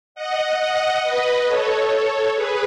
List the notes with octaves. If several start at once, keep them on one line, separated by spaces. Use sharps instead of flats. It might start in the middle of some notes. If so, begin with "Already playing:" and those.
D#5 F#5
D#5 F#5
B4 D#5
A4 C#5
G#4 B4